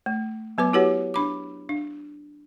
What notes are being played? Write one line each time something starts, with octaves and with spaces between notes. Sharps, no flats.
A3
F#3 B3 B4 D6
E4 F#4 G4 B4 C#5 F#5
D4 B5 D6
D4